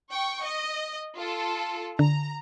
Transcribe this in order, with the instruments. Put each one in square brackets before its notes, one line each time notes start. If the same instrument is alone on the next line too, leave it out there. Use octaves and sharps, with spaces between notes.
[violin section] G5 C#6
D#5
F4 A4
[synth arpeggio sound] D3 [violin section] A#5